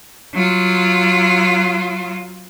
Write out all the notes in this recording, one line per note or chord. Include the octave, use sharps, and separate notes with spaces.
F#3 F4